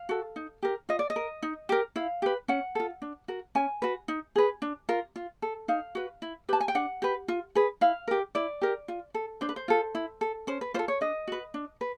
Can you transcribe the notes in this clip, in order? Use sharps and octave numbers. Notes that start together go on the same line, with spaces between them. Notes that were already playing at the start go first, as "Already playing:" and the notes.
Already playing: F5
F#4 A4
D#4
G4 A#4
F4 D#5
D5
D#5
A#4
D#4
G4 A#4
E4 F5
G4 B4
C#4 F#5
F4 A4
D4
F#4 A#4
C#4 G#5
F#4 B4
D#4
G#4 B4
D4
F4 A#4
F4
A4
D#4 F5
F#4 B4
E4
G4 B4 A5
G#5
G5
D4 F#5
G4 B4
F4
G#4 B4
E4 F5
G4 A#4
E4 D5
G4 A#4
F4
A4
D4 C5
B4
C5
F4 A4
E4
A4
C#4 C5
B4
F4 A4 C5
C#5
D4 D#5
F#4 B4
D4
B4